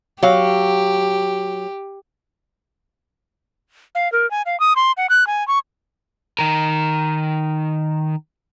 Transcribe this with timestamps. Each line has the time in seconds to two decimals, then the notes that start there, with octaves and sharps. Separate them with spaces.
0.23 F#3 G4 F5
3.95 F5
4.12 A#4
4.31 G#5
4.46 F5
4.60 D#6
4.76 C6
4.97 F#5
5.10 F#6
5.27 G#5
5.48 C#6
6.39 D#3 A#4